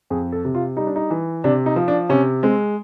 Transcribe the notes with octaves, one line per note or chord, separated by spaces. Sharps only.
F2 G#4
A4
C3
F4
G3 D#4
D4
D#4
E3
C3 D4
D#4
F3
D4
C3 C#4
G#3 C4